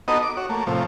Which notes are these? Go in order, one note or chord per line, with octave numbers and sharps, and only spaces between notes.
B3 D#4 F#4 A4 D#5 A#5
D6
F#4 C#5
A3 A#3
A2 C3 F3